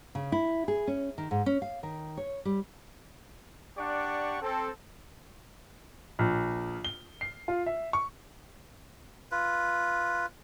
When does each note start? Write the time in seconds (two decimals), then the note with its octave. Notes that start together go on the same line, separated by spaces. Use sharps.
0.15 C#3
0.32 E4
0.68 G#4
0.87 C#4
1.18 D#3
1.31 G#2
1.46 C#4
1.62 F5
1.83 D#3
2.17 C#5
2.45 G3
3.76 D4 G4 D5 F#5 C#6
4.41 C4 A4
6.19 A#1
6.85 G7
7.21 C7
7.48 F4
7.66 E5
7.93 C#6
9.32 F4 B4